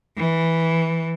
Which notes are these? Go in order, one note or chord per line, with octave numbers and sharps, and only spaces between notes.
E3